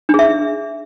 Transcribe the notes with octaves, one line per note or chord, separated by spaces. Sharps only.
D4 G#4 E5